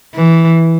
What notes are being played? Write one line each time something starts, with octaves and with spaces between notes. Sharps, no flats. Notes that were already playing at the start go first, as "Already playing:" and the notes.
E3